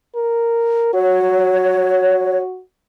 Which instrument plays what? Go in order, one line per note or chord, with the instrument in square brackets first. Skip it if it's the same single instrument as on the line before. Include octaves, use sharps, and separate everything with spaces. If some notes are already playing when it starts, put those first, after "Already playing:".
[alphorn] A#4
[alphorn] F#4 [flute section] C#5